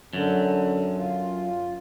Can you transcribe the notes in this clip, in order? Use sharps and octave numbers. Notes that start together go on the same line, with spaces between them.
F#2 D3
F4